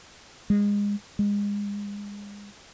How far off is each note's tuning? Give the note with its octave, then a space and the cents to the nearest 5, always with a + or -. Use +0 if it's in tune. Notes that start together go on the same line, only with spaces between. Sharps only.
G#3 -25
G#3 -30